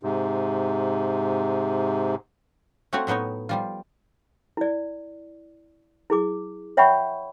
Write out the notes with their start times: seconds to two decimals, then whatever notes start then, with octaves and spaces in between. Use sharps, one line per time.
0.03 G#2 C3
2.93 A3 C4 F4 F#4 C#5
3.07 A2 F#3 B3 D#4 C#5
3.49 F3 G3 F4
4.57 E4 D5
6.10 E4 G#4 D6
6.77 C#5 E5 F#5 G5 B5 C#6